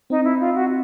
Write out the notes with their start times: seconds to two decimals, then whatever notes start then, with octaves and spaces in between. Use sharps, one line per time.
0.10 C4 D#4
0.24 E4
0.40 F4
0.55 F#4